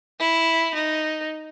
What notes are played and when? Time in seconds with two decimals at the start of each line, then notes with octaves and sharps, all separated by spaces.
0.20 E4
0.74 D#4